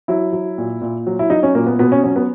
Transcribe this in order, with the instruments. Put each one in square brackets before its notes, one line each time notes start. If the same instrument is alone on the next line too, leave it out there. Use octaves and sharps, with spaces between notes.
[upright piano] F#3 E4
F#3
A#2
A#2
F#3
E4
F#3 D#4
C#4
A#2 A#3
B3
B2 B3
C#4
F#3 C#4
B3